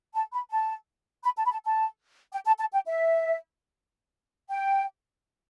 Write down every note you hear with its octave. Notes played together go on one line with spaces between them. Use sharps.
A5
B5
A5
B5
A5
B5
A5
A5
G5
A5
A5
G5
E5
G5